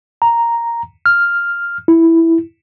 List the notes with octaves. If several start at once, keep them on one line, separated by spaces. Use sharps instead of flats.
A#5
F6
E4